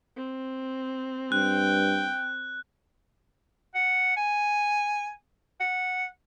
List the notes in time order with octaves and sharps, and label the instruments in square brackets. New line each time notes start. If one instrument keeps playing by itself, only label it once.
[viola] C4
[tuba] G2 [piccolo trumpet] G5 [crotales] F#6
[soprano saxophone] F#5
G#5
F#5